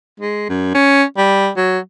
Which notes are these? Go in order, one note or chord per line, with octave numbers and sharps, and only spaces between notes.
G#3
F#2
C#4
G3
F#3